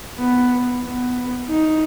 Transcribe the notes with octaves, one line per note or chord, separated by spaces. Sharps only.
B3
B3
D#4